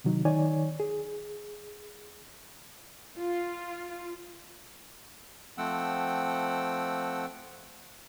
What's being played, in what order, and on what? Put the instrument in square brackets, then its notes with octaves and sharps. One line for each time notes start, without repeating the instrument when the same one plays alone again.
[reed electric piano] C3 D#3 F#3 D#4
D#3 D#4 C#5 D5 G#5
G#4
[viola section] F4
[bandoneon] F3 A3 C4 F#5 G5 E6